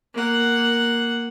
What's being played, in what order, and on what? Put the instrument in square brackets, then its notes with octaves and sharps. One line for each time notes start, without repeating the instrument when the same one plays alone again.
[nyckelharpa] A#3 F#5